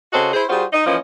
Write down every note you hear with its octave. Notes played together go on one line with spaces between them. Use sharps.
C#3 F#4 A4 C5 D#5
E4 G#4 C5
G3 F4 F#4 G#4 C5
D#4 D#5
E3 F3 A#3 C#4 D#5